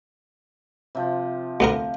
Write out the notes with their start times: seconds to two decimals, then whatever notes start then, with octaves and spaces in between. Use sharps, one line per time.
0.95 C3 F3
1.60 D2 B3 A#4